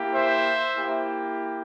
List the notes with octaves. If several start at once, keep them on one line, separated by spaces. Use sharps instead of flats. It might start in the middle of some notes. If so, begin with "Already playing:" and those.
Already playing: A#3 E4 G4
C5 E5
A#3 E4 G4